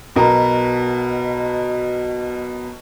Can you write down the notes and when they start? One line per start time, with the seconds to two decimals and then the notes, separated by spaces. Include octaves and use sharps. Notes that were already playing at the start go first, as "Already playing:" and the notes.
0.16 B1 B2 A#4